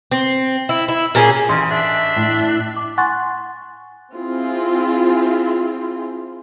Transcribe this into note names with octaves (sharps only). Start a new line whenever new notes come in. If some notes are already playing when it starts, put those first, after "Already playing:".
C4
E4
E4
A#2 C#4 G#4
A1 C#3 C6
D4 E5
A2
D6
F#5 G#5 C6 C#6 F#6 A6
C4 E4 F4 G#4